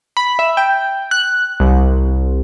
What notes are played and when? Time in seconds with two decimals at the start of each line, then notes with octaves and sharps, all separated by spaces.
0.17 B5
0.39 E5
0.57 G5
1.11 F#6
1.60 C2